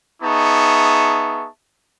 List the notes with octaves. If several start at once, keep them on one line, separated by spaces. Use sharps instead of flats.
B3 D#4 G#4 E5 A5 C#6